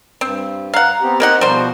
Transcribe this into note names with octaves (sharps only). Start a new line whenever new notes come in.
G2 C4
F5 F#5 A#5
B3 C4 G4
A#3 C4 D#4 G4 D#5 F#5
B2 F3 G3 F#4 C5